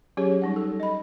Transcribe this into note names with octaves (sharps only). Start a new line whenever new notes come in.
F#3 C#4 G4 G#4 C#5
G3 D#4 F#5
A4
D#5 B5